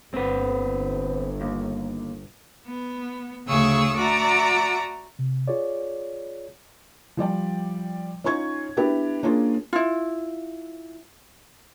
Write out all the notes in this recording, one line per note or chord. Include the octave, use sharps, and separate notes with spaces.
G1 C4 B4
D#2
B3
D2 C#3 G#4 C#6 D#6 E6
F#4 D5 E5 A5 A#5
C3
F4 G#4 C#5 D5
F3 G3 D5 G5
C#4 D#4 F4 C#6 G#6
B3 D4 E4 G4 B4
A#3 C#4 D4 F4 G#4
E4 F4